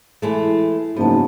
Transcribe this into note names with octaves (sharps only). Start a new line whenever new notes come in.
E3 G#3 A3
F#1 G#2 F3 B3 A5